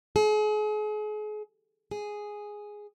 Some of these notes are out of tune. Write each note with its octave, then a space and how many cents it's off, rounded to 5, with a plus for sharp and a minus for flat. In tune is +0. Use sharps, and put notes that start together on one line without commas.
G#4 +40
G#4 +0